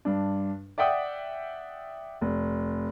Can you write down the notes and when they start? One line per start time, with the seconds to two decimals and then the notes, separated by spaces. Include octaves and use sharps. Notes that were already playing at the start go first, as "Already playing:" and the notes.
0.05 G2 D4
0.78 D5 E5 F#5 G5 D#6
2.21 F1